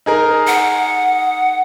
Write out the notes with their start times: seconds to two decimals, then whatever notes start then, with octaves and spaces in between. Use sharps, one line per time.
0.06 D#4 G#4 A#4
0.47 F#5